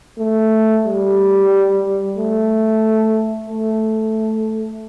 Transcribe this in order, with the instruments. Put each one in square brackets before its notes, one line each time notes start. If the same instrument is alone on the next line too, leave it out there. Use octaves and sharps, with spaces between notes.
[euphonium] A3
G3
A3
A3